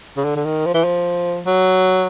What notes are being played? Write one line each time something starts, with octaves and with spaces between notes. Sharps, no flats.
C#3
D3
D3
D#3
F3
E3
F3
F#3